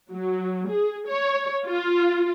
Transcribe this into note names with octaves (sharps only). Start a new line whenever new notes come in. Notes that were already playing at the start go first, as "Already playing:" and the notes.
F#3
G#4
C#5
F4